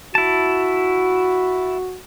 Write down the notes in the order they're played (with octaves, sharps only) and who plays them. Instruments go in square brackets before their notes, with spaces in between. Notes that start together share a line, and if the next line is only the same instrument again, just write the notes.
[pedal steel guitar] E4 A5 [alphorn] F#4